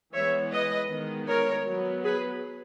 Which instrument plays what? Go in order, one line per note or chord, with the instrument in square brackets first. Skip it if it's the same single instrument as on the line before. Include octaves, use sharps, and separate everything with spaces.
[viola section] E3 G#3 B3 C#5 E5
B4 D#5
D#3 G#3 B3
A#4 C#5
F#3 B3
G#4 B4